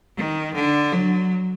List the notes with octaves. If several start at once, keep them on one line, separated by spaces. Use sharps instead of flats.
D#3
D3
F#3